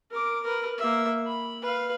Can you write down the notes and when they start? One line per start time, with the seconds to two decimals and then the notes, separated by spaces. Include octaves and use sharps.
0.11 A#4 D6
0.43 A#4 B4
0.78 A#3 E5
1.26 B5
1.62 B4 F5